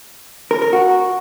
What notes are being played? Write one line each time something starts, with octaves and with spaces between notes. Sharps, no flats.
A#4
A#4
F#4